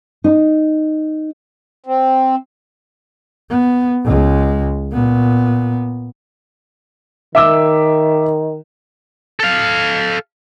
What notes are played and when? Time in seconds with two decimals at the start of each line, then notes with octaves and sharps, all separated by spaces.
0.24 D#4
1.86 C4
3.50 B3
4.04 C#2 G#3
4.92 A#2 B3
7.35 D#3 E5 D6 E6
9.40 A4 F5